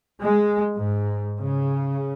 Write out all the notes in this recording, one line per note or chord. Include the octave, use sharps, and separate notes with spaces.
G#3
G#2
C#3